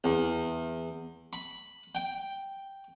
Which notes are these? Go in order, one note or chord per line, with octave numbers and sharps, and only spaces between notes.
E2
B5
G5